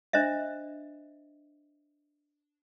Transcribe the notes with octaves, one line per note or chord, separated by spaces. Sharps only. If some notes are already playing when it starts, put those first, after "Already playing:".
D4 C5 D#5 E5